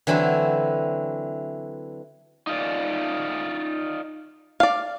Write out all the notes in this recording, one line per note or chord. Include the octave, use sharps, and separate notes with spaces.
D3 E3 F#3 C4 E4
D#4 F4 D5
D5 F5